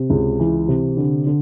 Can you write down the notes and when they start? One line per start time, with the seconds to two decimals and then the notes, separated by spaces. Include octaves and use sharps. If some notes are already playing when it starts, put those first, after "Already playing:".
Already playing: C3
0.10 C#2
0.39 E3
0.68 C3
0.97 D3
1.26 D3